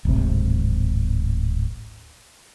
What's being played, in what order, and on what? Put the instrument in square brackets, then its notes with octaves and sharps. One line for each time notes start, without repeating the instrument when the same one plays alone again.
[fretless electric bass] D1 G#1 C3